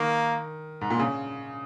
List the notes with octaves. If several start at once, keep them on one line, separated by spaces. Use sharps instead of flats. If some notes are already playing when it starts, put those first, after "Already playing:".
Already playing: D#3 A#3
G#2
A#2
C#3